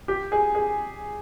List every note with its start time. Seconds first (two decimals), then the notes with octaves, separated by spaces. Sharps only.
0.08 G4
0.32 G#4
0.55 G#4